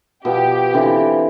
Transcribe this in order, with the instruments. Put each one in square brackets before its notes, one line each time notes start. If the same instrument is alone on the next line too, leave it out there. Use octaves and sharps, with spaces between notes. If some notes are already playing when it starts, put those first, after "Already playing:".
[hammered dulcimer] B2 F3 [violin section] G4
[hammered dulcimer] D3 E3 C4